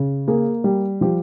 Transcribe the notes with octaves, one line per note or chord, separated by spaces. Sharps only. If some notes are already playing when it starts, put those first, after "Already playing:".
Already playing: C#3
A#3 G#4
G3
F3 G4